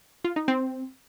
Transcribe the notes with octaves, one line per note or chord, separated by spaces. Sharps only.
F4
D#4
C4